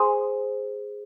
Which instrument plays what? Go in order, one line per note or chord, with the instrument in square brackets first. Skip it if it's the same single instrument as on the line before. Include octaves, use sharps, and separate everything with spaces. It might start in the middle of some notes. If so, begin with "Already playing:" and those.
Already playing: [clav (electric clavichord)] G#4 C5